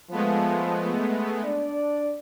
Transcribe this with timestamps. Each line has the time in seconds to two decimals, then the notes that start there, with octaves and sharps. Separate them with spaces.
0.11 F3 G#3 A3 B3
1.44 D4 D5